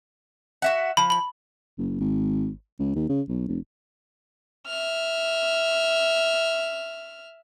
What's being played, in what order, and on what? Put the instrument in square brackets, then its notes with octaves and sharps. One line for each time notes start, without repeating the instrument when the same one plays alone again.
[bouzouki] F#4 E5 F#5
[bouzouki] F3 [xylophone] B5
[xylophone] B5 F#7
[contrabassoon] F#1
G#1
C#2
D#2
C#3
B1
F1
[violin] E5 F6